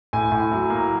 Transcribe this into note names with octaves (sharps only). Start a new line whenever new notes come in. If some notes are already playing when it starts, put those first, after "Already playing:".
A2 G#5
A2
F#3
A#3